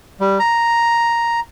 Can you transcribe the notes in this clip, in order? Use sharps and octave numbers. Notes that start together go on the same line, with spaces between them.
G3
A#5